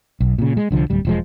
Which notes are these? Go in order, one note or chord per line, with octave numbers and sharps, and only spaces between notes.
B1
A#2 C#3
G#3
C2 D3 F3
D1 G3
E1 F3 G#3